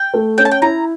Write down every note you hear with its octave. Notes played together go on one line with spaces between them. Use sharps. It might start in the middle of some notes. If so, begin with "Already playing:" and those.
Already playing: G5
A3
C#4 G5
A5
G5
E4 A#5